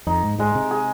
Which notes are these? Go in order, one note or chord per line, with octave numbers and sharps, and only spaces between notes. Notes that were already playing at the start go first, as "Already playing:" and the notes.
F2 D#4
G#2
G#2 G#3
C3
G#4